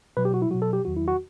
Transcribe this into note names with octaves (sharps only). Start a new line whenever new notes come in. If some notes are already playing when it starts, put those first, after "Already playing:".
B2 F#3 B4
G4
F#4
E4
B2 F#3 F#4
A4
G4
E2 D#3 F#3 F#4
E4
F#4